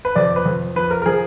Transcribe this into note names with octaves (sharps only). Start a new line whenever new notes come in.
B4
F2 D5
B4
F2
F3 B4
A#4
A#4
F3 G#4